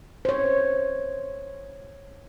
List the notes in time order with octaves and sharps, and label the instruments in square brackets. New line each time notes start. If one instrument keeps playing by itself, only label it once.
[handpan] C5 C#5